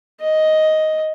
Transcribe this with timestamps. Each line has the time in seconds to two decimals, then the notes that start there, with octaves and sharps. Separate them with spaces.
0.20 D#5